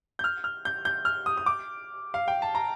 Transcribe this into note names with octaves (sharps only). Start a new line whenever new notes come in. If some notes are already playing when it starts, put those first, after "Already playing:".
G6
F6
F6
G6
G6
F6
D#6
D#6
D6
F5
G5
A5
A#5